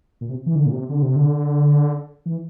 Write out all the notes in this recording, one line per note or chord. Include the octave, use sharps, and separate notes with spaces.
A#2
C3
E3
D3
A#2
C3
D3
C3
D3
E3